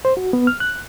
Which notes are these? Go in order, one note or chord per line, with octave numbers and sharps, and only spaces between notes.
C5
F#4
B3
F6
F#6